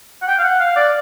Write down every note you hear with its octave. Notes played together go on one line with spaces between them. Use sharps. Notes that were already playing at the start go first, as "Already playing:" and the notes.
F#5
G5
F5
F#5
F5
D5